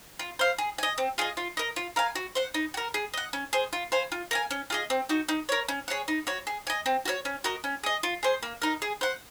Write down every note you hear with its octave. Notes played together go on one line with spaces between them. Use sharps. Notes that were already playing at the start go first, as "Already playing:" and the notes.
F4
C5 F5
G#4
D#5 G#5
C4
F4 G#4 D#5
F4
A#4 D#5
F4
A#4 F5 G#5
F#4
C5 F#5
D#4
F#4 A#4
G#4
D#5 F#5
C#4
G#4 C5
F4
C5 F5 G#5
F4
A#4 F5 G#5
C#4
F4 G#4 D#5
C4
D#4 F#4
D#4
A#4 C#5
C#4
G#4 C#5 F#5
D#4
F#4 C#5
G#4
D#5 G#5
C4
F#4 A#4 C#5
C#4
F#4 A#4 D#5
C#4
G#4 D#5
F4
G#4 C5
A#3
D#4 A#4
G#4
C5 F#5